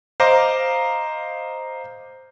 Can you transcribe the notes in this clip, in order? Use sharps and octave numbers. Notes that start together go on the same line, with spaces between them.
C5 D#5 F5 A#5 D6